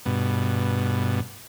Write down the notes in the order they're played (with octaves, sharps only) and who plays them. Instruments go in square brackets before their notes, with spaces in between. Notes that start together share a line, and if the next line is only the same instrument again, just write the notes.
[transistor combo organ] G2 B2